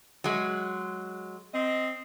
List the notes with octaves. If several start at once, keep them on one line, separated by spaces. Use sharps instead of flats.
F#3 G#3
C4 D#5